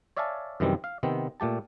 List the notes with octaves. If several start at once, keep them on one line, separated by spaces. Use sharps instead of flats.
C#5 D5 E5 F5 G#5 A5
F#2 C3 D#3 E3 G3 C4
F5
C3 D#3 B3 C4
A#2 A3 G4 A5